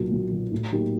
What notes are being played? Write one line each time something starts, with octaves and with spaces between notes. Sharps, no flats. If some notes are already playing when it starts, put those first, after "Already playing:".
Already playing: B1 A#2 F#3
B1
A#2 F#3
A2
F#3 A#3 D#4 G4